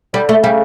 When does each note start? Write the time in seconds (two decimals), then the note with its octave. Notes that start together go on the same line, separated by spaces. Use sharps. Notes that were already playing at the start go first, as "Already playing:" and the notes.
0.13 D3 G3
0.29 A3
0.43 C#3 G3